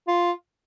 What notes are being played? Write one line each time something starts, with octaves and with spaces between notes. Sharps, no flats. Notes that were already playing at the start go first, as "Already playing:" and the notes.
F4